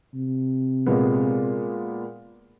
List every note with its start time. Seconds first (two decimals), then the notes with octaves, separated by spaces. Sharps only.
0.14 C3
0.86 A#2 G#3 B3